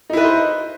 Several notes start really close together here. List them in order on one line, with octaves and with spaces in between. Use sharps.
D#4 E4 B4 D#5 C5